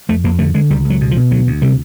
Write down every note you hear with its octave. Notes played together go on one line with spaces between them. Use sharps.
F2 A3
F2 A#3
D3 A3
D3 G#3
C#2 G3
C#2
F#3
B2
F3
B2
D2 F#3
D2
C3 G3